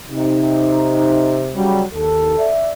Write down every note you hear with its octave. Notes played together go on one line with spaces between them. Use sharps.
C3 D#4
C#3 F#3 G3
D#2 A4
D5 E5